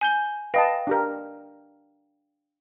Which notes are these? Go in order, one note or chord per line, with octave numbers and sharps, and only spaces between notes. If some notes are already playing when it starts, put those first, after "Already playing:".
G#5 G6 G7
B4 D#5 F5 G5 A5 A#6
D4 G4 A#4